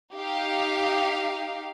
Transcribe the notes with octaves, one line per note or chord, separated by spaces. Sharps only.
D#4 G4 F5